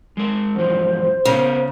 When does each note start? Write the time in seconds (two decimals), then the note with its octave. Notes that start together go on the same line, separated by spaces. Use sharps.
0.17 G#3 A#4
0.55 E2 G#2 F3 C5
1.25 C#3 B3 A#4